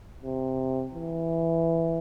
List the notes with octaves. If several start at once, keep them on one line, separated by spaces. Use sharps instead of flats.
C3
E3